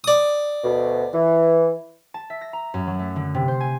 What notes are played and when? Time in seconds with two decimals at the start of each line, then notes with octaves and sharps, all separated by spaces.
0.04 D5 D#6
0.64 D2 B2
1.13 E3
2.14 A5
2.30 E5
2.41 A#6
2.53 A#5
2.74 F#2
2.87 F#3
2.99 A3
3.16 D3
3.35 C3
3.48 C5
3.61 G#5